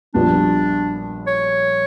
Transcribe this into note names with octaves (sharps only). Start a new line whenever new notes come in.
A#1 A#2 G3 B3 D4 F#4
C#5